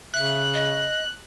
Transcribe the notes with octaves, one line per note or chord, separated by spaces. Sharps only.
C#3 E5 F#6
D#5